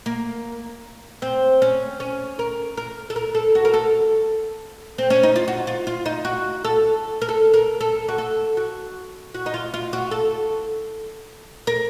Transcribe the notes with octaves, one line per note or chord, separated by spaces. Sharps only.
A#3
C4
C#4
C#4
A#4
A#4
A4
A#4
A4
F#4
A#4
A4
C4
C#4
D#4
F4
F#4
F4
F4
D#4
F#4
A4
A#4
A4
A#4
A4
F#4
A4
F#4
F#4
D#4
F4
F4
F#4
A4
A#4